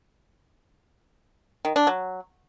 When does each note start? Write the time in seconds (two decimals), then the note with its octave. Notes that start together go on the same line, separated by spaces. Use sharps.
1.65 D#3
1.76 D4
1.87 F#3